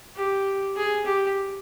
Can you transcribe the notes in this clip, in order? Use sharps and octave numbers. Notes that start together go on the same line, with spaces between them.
G4
G#4
G4